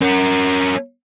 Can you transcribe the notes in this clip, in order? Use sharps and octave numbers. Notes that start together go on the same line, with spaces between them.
C#4 A#4